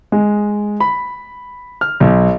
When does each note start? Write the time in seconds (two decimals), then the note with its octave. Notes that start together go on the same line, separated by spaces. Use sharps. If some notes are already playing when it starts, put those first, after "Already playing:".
0.12 G#3
0.80 B5
1.81 F6
2.00 B1